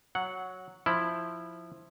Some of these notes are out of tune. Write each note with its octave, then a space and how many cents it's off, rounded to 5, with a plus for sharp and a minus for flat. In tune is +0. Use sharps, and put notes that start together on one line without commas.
F#3 +0 F#5 -10
F3 +0 E4 +0